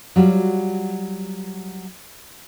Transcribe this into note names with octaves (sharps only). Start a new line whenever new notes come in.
F#3 G3 F4 F#4